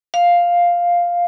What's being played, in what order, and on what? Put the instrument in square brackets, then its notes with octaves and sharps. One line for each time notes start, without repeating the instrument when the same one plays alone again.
[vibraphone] F5